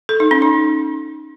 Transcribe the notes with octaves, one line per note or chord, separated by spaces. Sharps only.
A4
D#4
C#4
D#4